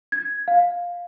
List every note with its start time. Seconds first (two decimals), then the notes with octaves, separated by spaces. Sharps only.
0.12 G#6
0.48 F5